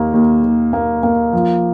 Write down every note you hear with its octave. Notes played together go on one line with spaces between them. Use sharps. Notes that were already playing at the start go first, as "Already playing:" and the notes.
Already playing: D#2 A#3
D#2
D#2
A#3
A#3
F3